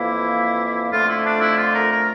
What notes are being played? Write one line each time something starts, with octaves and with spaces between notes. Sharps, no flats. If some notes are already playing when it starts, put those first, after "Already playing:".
Already playing: F2 E3 A#3 E4
F2 D3 A3 F4
E4
D4
E4
F4
A#4
A#4